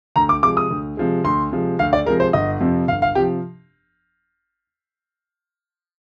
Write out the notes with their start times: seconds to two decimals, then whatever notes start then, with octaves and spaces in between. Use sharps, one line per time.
0.16 D2 A#5
0.29 D6
0.43 C3 F3 G#3 D6
0.57 D#6
0.71 D2
0.97 C3 F3 G#3
1.24 D2 C6
1.52 C3 F3 G#3
1.79 D2 F5
1.93 D5
2.06 C3 F3 G#3 A#4
2.20 C5
2.33 G1 D#5
2.60 F2 C3 F3
2.88 G1 F5
3.02 F5
3.15 C3 F3 G4